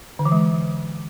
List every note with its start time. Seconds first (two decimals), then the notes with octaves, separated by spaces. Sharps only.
0.19 D3
0.26 E3
0.32 G#3